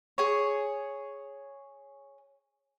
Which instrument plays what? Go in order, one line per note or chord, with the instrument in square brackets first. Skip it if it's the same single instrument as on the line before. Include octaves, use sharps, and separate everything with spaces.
[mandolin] G#4 C#5